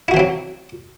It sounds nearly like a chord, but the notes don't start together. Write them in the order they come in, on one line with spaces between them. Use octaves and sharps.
E4 F#4 E3 C4 F#3